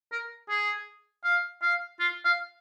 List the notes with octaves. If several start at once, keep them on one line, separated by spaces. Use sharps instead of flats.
A#4
G#4
F5
F5
F4
F5